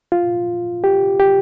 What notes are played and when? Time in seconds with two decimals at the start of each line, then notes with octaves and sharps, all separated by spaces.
0.12 F4
0.84 G4
1.20 G4